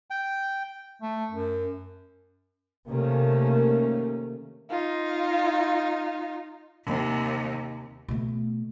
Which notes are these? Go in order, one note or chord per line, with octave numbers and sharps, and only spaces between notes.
G5
A3
F#2
C3 D#3 A3 A#3 C#4
D#4 F4
D#2 C3
B2 A3